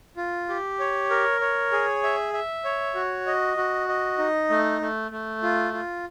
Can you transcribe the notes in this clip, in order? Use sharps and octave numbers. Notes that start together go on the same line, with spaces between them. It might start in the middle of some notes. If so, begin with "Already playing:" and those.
F4
G4
C#5
A#4
C#5
G#4
E5
E5
C#5
F#4
D#5
F#4
D#5
D#4
A3
A3
A3
F4
F4